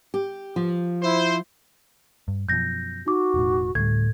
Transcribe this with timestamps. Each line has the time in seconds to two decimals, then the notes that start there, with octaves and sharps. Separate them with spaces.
0.14 G4
0.56 F3
1.03 E4 C5
2.28 G2
2.49 F#2 B2 F3 G6 A#6
3.06 D#4 F#4 D6
3.34 E1 A2
3.75 D2 A2 G3 G#6